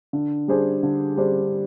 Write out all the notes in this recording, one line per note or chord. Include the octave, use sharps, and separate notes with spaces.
D3
G3 D4 G#4 C5
D3
G3 D4 G#4 C5